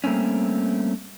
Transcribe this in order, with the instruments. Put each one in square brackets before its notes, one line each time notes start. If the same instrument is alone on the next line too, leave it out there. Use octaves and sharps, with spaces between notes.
[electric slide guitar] G3 A3 A#3 C4 C#4